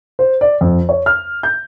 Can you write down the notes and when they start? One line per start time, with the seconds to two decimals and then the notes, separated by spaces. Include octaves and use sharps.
0.19 C5
0.41 D5
0.61 F2
0.89 C#5
1.06 F6
1.43 G6